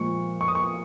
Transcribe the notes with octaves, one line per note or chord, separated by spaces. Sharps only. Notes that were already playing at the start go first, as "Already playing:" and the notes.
Already playing: A#2 F3 G#3 C#6
C#6
D#6
C#6